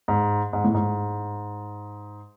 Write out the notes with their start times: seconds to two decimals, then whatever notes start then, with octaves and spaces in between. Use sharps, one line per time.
0.08 G#2
0.53 G#2
0.64 A2
0.74 G#2